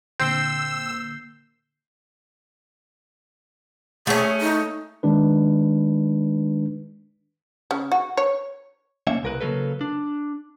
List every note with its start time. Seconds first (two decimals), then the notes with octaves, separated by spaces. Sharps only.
0.20 A#2 D3 A#3 C4 E6 G6 C7 G7
4.07 A3 C#4 G#4
4.41 D#4
5.03 D#3 G#3 D4 B4
7.71 C#3
7.92 F#4
8.17 C#5
9.07 A#3 C#4 E5
9.23 C2 A#4 B4
9.41 C#3 F#3 A#3 A4 B4
9.81 D4